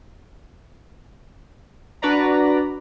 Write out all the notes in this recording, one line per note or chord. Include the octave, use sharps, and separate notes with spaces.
D4 F#4 B4 D5 A#5